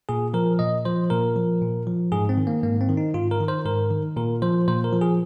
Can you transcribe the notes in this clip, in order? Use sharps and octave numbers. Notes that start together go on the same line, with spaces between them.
A#2 G#4
F3 A#4
A#2 D#5
F3 C5
A#2 A#4
F3
A#2
F3
G#2 G#4
C4
D#3
A#3
G#2 A#3
C4
D#3
D#4
G#2 F4
A#4
D#3
C5
G#2 A#4
D#3
A#2 A#4
F3 C5
A#2 C5
A#4
F3
G#4